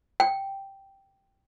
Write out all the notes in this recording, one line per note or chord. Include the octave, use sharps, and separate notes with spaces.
G5